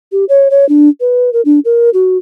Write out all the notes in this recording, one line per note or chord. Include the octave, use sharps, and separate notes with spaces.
G4
C#5
C#5
D4
B4
A#4
D4
A#4
F#4